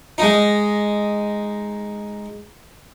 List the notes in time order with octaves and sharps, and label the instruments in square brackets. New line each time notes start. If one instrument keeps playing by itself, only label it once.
[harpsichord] G#3 D#4